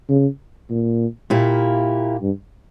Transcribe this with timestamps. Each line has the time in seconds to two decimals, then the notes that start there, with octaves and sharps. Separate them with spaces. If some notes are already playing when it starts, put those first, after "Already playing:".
0.09 C#3
0.70 A#2
1.30 A#2 A#3 E4 G4
2.22 G2